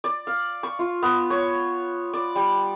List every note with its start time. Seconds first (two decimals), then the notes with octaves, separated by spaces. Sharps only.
0.04 D5
0.27 F5
0.63 C#6
0.79 F4
1.02 B3
1.30 C#5
2.13 D5
2.35 G3